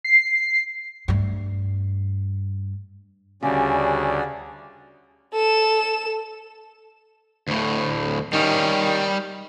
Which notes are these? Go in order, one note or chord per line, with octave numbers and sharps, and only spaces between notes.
C7
G2 A3
D2 C#3 G3 C#4 F#4 G#4 D5
A4 E7
D2 A2
D#3 G3 C#4